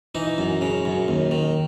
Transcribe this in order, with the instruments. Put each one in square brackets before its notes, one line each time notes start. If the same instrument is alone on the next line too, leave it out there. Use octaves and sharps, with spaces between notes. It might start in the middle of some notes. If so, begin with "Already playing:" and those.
[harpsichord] E3 D#4
F#2
C#3
F#2
D#2
D#3